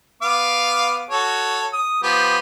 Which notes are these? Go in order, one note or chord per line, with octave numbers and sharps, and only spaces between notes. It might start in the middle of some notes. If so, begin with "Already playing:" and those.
B3 F5 D6
F#4 A4 C#5
D#6
F3 B3 G4